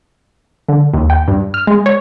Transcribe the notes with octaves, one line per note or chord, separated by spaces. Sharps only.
D3
D#2
G5
G2
F6
G#3
C#5